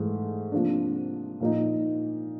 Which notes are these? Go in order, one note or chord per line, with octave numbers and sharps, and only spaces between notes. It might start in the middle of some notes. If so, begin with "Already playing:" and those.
Already playing: G#2 E3 A3
C3 F3 A#3 D4
A#2 F3 A#3 D#4